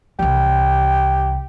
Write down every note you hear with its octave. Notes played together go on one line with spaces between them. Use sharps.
C2 E3 G4